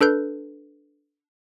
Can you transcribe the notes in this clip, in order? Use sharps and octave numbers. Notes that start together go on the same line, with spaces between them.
D4 A4 B4 G6